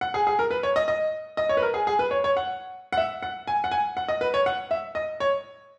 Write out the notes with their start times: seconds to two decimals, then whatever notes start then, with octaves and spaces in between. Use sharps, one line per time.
0.01 F#5
0.14 G#4
0.27 G#4
0.39 A#4
0.51 B4
0.63 C#5
0.76 D#5
0.88 D#5
1.37 D#5
1.49 C#5
1.57 B4
1.62 A#4
1.74 G#4
1.87 G#4
1.99 B4
2.11 C#5
2.24 C#5
2.37 F#5
2.93 F#5
2.97 E5
3.22 F#5
3.47 G#5
3.64 F#5
3.71 G#5
3.97 F#5
4.08 D#5
4.21 B4
4.34 C#5
4.46 F#5
4.71 E5
4.95 D#5
5.20 C#5